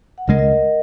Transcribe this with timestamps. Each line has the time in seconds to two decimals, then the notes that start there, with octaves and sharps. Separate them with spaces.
0.18 F#5
0.27 C#2 C#3 G#3 A#4 D#5
0.38 A#4 D#5